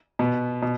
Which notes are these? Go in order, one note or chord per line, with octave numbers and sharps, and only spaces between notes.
B2 B3
B2